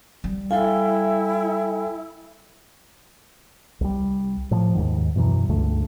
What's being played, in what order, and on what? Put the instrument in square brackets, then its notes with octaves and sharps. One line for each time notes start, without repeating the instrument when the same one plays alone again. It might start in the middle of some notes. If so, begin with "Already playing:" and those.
[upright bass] G3
[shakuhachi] E4 [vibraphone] A4 G5 G#5 [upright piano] F5
[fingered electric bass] C2 G3
A2 F3
D#2 G#2 D#3
F#2 B2 E3 F#3
C#2 G2 D3 A3